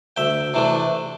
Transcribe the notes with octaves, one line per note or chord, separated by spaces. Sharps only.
D2 E5 G5
C3 E3 A3 D4